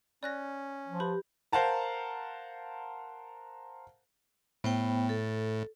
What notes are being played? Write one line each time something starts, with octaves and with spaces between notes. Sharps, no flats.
C#4 D5 F#6 A#6
F3
G4 B4 B5
A#4 C5 F5 F#5 A5 A#5
A2 B3 C5 G5
A4